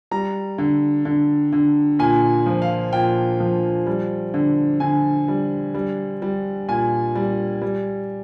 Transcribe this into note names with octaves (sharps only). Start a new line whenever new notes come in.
G3 A#5
D3
D3
D3
A#2 G#5
F3
F5
A#2 G5
F3
G3
D3
D3 G#5
G3
G3
G3
A#2 G#5
G3
G3